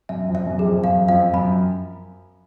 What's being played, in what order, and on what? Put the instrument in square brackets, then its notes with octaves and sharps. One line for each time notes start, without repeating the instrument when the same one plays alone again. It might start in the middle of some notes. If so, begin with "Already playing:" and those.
[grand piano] F#2 [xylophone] E5
[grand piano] F2
[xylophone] E5
[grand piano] F#2
[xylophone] G#4
[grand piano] F2
[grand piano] F#2 [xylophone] F5
[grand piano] F2 [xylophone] F5
[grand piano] F#2 [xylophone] B5